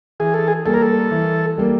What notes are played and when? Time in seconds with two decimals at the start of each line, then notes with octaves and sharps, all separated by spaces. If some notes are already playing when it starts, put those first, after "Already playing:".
0.20 E3 G#4
0.34 A4
0.48 G#4
0.66 G3 A#3 A4
0.74 A#4
0.82 A4
1.11 E3
1.58 G3 A#3